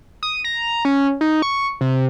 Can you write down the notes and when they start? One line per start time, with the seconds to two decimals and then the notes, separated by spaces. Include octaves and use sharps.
0.23 D#6
0.44 A#5
0.85 C#4
1.21 D#4
1.42 C#6
1.81 C3